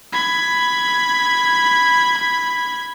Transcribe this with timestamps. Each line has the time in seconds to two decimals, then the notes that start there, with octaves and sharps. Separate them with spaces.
0.12 B5 G#6